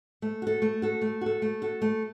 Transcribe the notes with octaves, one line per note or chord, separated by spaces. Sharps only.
A3
F#4 A4
A3
F#4 A4
A3
F#4 A4
A3
F#4 A4
A3